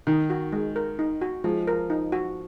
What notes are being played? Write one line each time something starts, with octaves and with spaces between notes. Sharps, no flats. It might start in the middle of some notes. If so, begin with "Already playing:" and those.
D#3 D#4
F#4
G#3
A#4
D#4
F#4
F3 G#3
A#4
D#4
F#4